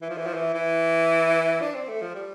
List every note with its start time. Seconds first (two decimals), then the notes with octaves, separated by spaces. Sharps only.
0.02 E3
0.09 F3
0.17 E3
0.26 F3
0.34 E3
0.54 E3
1.61 D4
1.75 C4
1.88 A3
2.02 F3
2.15 G3